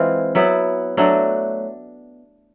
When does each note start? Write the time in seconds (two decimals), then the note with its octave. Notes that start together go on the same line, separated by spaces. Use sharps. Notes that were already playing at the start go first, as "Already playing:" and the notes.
Already playing: E3 G#3 C4 F4
0.35 F#3 B3 E4
0.97 F#3 A3 D4 F#4